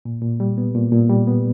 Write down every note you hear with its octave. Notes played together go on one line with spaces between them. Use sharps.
A#2
A#2
G3
B3
A#2
A#2
G3
B3